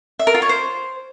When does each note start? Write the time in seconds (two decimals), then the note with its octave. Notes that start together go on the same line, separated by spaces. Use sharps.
0.19 E5
0.27 A#4
0.34 F4
0.42 C#5
0.49 C5